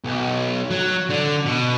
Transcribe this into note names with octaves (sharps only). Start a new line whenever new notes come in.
B1
F#3
D3
B2